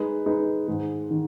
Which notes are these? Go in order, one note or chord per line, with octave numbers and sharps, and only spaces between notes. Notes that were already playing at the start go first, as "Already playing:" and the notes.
Already playing: G#3 D#4 B4
G#3 D#4 B4
G#2 D#3 G#3
D#3